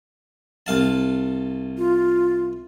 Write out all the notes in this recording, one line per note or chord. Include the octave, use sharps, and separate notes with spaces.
C2 F5 A5
F4